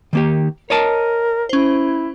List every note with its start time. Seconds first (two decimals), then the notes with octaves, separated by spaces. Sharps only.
0.13 D#3 A#3 G4
0.70 A#4 C#5 D#5 A5
1.49 C#4 E4 C5